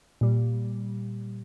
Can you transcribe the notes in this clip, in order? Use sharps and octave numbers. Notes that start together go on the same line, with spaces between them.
A#2 G3